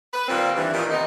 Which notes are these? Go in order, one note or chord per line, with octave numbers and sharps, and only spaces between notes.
B4
A#2 D#3 G3 A#3 C4
G2 E3
A#2 D#3
C3 B3 D#4